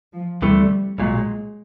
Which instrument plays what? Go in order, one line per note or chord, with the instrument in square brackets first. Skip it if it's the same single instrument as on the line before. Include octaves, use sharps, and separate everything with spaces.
[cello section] F3
[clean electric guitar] D2 C3 E3 A3 [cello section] G3
[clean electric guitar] B1 A#2 F#3 [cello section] G#3